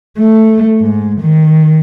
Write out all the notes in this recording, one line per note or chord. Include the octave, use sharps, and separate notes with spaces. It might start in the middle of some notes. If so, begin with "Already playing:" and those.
A3
G#2
D#3